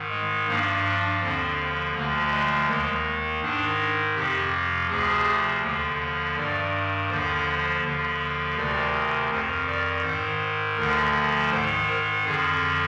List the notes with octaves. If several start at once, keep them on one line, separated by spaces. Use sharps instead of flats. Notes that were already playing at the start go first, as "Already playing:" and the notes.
Already playing: G#2 D#3
G#3
G2 F3 A#3
D4
D#2 D3 F3 C4
D2 D3 F3 A#3
G#3
D#2 D#3 G#3
G#2 D#3 D4
F2 C3 F3 G4
D2 C3 F3 G#4
D#2 D3 F3
G2 D#3 D5
D#2 D3 F3 C5
D#2 D3 F3
D2 C3 D#3 D5
F2 D#3 C5
D5
G#2 D#3 C5
D2 D3 F3 A#4
G#2 D#3 C5
A#4
F2 D3 F3 G#4